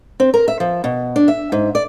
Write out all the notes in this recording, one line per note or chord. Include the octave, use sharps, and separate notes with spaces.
C4
A#4
E5
F3
B2
D4
E5
G#2
D5